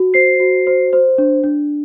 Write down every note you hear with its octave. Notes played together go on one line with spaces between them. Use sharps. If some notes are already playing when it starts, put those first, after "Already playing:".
Already playing: F#4
C5 C7
F#4
C5
C5
D4
D4